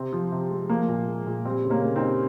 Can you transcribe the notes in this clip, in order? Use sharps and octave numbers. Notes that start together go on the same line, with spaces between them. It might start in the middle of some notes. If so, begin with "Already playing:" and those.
Already playing: C3 C4
F3
C3
G#3
F3 A#3
A#2
G#3
A#2
G3 C4
C#3
A#3 C#4
C#3
C4 D#4
G3